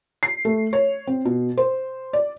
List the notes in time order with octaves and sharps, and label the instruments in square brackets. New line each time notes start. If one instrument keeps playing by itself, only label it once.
[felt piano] C7
A3
C#5
C4
B2
C5
D5